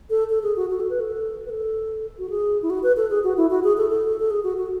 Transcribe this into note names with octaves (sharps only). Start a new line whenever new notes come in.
A4
A4
G#4
F#4
F#4
A4
B4
A4
B4
A4
F#4
G#4
E4
F#4
B4
A4
G#4
F#4
E4
F#4
G#4
A4
A4
A4
G#4
F#4
F#4